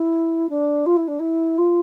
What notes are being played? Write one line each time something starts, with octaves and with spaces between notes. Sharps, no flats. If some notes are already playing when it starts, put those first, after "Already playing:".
Already playing: E4
D4
F4
E4
D4
E4
F4